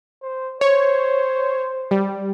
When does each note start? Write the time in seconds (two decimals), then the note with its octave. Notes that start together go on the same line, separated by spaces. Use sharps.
0.22 C5
0.61 C5 C#5
1.91 G3